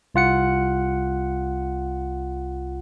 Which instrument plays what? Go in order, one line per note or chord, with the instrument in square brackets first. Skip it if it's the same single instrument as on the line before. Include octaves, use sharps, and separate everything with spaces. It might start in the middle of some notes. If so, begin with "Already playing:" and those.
[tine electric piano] C2 F4 F#5 C#7